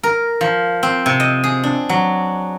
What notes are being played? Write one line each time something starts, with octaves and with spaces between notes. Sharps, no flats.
A#4
F3
C4
C3
D#5
G#4
D4
F#3